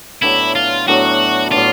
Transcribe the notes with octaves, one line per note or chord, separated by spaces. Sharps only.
A2 F#3 B3 D4 E4
F4
A2 F#3 B3 D4 F#4
A2 F#3 B3 D4 F4